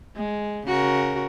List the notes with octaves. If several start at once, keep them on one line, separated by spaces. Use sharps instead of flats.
G#3
C#3 F#4 A#4